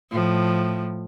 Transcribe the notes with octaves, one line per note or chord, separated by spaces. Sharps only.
A2 F3